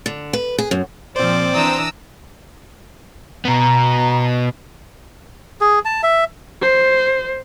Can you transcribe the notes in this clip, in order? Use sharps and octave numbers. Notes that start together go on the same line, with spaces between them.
D3
B4
G#4
F#2
A#2 F3 C4 C5 D5
E3 D4 A#5 D#6 E6
B2 B3 A#5
G#4
A5
E5
C5